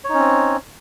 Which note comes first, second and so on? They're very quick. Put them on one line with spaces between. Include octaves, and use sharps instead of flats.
C#5 D#4 C#4 C4